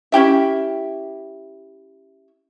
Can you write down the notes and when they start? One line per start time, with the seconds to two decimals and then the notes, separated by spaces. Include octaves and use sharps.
0.12 C#4 E4 G4 E5